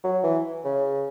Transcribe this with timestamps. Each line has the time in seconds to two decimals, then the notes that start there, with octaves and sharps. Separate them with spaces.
0.04 F#3
0.24 E3
0.65 C#3